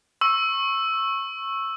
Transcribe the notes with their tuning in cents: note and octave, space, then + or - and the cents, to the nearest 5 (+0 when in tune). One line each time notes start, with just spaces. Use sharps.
C#6 -20 E6 +0